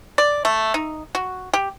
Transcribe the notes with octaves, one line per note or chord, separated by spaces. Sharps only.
D5
A3
D#4
F#4
G4